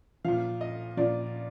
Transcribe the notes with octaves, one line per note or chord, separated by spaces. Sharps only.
A#2 F3 F5
D#5
A#2 F3 D5